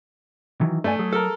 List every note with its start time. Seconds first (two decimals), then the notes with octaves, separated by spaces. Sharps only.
0.61 D#3 E3 F#3
0.84 G2 A3 D5 G#5
0.99 F#3 G#4
1.13 A4 A#4